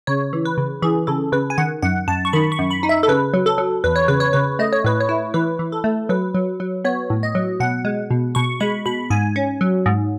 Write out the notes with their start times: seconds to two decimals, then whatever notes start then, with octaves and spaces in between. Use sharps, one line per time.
0.07 C#3 C#5
0.33 E3
0.45 B4
0.58 C#3
0.82 E3 G#4
1.07 C#3 A4
1.32 C#3 B4
1.50 G#5
1.58 D#3 F#5
1.83 F#2 F#5
2.08 F#2 A5
2.25 C#6
2.33 D#3 B5
2.52 C#6
2.59 F#2
2.71 B5
2.83 D#4
2.89 E5
3.03 A4
3.08 C#3 B4
3.34 F#3
3.46 A4
3.58 F#3
3.84 E2 B4
3.96 C#5
4.08 C#3 B4
4.20 C#5
4.33 C#3 B4
4.59 A3 D#5
4.73 C#5
4.84 A2 B4
5.00 C#5
5.09 E4
5.34 E3 B4
5.59 E3
5.72 A4
5.84 A3
6.09 F#3 B4
6.34 F#3
6.60 F#3
6.85 B3 C#5
7.10 A2
7.23 D#5
7.35 F#3
7.60 B2 F#5
7.85 G#3
8.11 B2
8.35 B2 C#6
8.60 G#3 B5
8.86 B2 B5
9.10 G#2 G#5
9.36 C#4
9.61 F#3
9.86 G#2